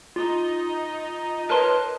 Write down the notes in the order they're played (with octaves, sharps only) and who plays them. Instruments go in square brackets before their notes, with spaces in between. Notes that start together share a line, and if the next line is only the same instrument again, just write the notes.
[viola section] D#4 D#5 [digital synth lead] F4
[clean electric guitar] A#4 C#5 C6 [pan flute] B4 [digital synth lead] A5